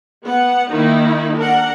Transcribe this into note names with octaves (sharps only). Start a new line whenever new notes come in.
B3 F#5
D#3 A#3 D#4 E4
D4 A#4 F#5